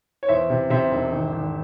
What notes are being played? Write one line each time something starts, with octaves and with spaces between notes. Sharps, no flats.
C#5
E2 C5 E5
C3
C3 C5 E5
E1
G#1
G#1